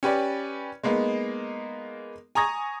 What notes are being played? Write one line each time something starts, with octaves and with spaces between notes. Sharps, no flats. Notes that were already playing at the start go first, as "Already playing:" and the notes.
C#4 G4 B4 D5
G#3 A#3 B3 D#4
G#5 A#5 C#6 D#6 G#6 A#6